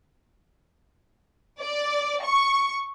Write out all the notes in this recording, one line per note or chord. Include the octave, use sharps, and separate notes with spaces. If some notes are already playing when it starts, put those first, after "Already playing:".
D5
C#6